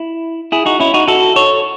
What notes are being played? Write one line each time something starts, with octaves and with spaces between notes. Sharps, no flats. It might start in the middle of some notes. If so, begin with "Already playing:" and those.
Already playing: E4
E4 G#4
D#4 F#4
C#4 E4
D#4 F#4
F#4 A4
A4 C#5